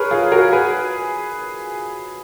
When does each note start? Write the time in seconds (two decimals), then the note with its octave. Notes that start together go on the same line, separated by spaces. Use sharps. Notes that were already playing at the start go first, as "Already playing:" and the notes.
Already playing: G#4 A#4 B4 C#5
0.11 F4 G#4
0.32 F#4 A#4
0.53 G#4 B4